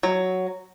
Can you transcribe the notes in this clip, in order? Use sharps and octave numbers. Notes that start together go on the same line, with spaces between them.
F#3